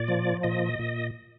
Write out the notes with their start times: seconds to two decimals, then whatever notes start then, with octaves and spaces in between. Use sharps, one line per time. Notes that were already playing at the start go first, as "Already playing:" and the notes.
Already playing: A#2 D5
0.08 F3
0.43 A#2 D#5
0.79 A#2